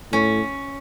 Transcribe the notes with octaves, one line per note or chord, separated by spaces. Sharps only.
A2 C#4